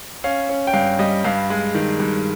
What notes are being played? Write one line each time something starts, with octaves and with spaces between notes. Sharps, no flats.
C#4 F5
C#4
G5
G2 F5
G3 D#5
G2 F5
G#3
D#3
G2